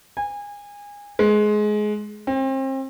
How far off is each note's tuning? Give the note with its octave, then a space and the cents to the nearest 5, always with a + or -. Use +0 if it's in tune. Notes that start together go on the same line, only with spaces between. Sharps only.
G#5 -25
G#3 +20
C4 +35